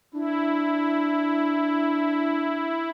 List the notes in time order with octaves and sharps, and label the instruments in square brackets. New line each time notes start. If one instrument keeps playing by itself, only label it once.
[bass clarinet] D4 [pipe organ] E4